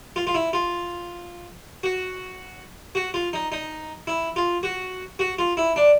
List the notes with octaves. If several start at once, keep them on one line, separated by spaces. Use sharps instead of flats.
F4
F4
E4
F4
F#4
F#4
F4
D#4
D#4
E4
F4
F#4
F#4
F4
E4
D4